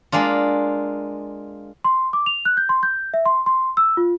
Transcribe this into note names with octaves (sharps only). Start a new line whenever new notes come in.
G#3 A#3 D4 F4
C6
D6
F7
F#6
G6
C6
G6
E5
C6
C6
E6
F4